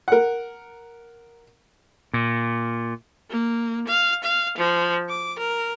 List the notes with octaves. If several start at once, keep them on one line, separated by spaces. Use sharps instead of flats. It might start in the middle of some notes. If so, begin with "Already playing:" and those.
A#4 F#5
A#2
A#3
F5
F5
F3
D6
A#4